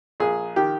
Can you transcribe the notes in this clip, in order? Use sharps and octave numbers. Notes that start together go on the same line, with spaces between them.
A#1 G#4
D#3 G4